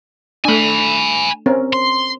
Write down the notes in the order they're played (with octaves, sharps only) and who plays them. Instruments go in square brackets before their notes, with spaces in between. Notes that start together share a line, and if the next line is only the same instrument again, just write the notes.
[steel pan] A3 D4 [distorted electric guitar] G#5 B5
[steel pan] C4 C#4 A#4
[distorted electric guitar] C6